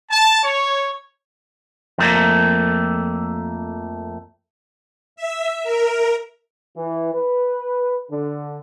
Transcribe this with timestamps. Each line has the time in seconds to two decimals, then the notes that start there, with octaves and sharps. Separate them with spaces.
0.10 A5
0.43 C#5
1.98 F2 A3 A#3
5.16 E5
5.63 A#4
6.76 E3
7.13 B4
8.11 D3